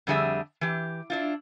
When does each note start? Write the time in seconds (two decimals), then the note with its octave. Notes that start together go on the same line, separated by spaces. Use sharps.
0.07 F2 D3 G3 G#4 E5
0.61 E3 G4
1.10 D4 E4 F4